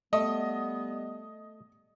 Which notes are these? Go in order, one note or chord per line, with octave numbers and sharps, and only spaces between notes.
G3 A3 B3 D#5